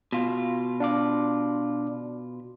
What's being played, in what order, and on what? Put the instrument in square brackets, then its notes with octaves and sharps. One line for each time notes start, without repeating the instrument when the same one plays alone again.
[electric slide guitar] B2 F4
[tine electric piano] D4 F5 D6